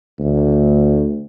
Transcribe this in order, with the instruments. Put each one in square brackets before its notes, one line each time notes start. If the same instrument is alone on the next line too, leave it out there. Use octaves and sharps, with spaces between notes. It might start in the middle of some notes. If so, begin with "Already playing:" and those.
[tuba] D2